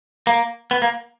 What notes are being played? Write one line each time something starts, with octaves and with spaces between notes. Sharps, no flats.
A#3
B3
A#3